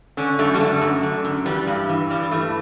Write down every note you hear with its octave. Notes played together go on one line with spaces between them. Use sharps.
D3 C#4
F#2 A3
G3
D3 A3
F#2
D3
F#2
E3 G3
G2
E3
G2 G3
E3 A3